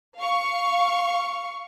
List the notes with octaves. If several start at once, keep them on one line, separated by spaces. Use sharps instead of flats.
F5 C#6